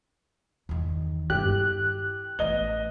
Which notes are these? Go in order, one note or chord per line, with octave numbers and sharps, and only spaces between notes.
E2 D#3
G2 E4 G4 F#6
A1 E3 D#5 G7